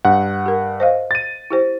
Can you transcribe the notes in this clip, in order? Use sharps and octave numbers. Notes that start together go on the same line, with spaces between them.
G2 F#5
G4 A#4
C5 D#5 F5
A6 D#7
E4 G4 C5